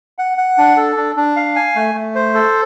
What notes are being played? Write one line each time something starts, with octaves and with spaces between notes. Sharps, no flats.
F#5
F#5
D4
A4
D4
D4
F5
G#5
A3
A3
C5
A4